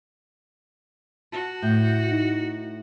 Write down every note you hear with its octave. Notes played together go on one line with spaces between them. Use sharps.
F#4 A5
A2 G6
D#4